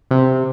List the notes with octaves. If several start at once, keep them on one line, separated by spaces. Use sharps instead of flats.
C3